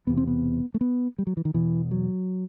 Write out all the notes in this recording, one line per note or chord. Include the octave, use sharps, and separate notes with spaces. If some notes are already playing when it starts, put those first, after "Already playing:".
E1 E2 C3 B3
C4
B3
A3
B3
G3
F#3
E3
D#3
E1 E2 B2 E3
F#3